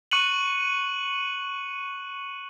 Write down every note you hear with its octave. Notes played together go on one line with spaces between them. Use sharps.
C#6 F#6 C#7 D#7 F#7